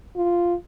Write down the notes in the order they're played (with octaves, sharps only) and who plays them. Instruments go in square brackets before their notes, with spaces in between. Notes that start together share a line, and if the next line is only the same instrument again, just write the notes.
[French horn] F4